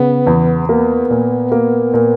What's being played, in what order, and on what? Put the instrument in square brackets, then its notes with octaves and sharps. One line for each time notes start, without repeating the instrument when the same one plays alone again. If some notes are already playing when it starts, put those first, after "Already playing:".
Already playing: [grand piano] C#3 [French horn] B3
[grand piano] E2
[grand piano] A#3 [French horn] B3
[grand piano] A#2
A#3
A#2